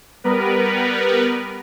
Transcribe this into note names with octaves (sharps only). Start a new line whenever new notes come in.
G3 B3 A#4 B4